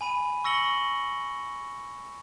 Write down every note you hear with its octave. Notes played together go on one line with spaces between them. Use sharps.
G#5 B5 D#7
C#6 E6 A#6 C#7 F#7 G7